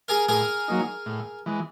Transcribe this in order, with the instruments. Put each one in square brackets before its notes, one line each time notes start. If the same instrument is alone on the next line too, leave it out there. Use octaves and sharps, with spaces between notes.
[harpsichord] G#4 A#4
[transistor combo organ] A2 [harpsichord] G#4 A#4
[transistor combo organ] F#3 A#3 D#4
A2
E3 G#3